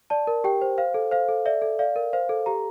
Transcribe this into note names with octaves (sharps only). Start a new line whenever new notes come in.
D5 A5
A#4
G4 G5
C5
C5 F5
A4
C5 F5
A4
D5 E5
A4
D5 F5
A#4
C5 F5
A4
G4 A#5